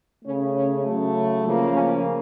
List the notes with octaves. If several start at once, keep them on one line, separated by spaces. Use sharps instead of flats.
C#3 A3 C#4
C#4
C#3 F#3 A3
C#3 F3 A#3
C#4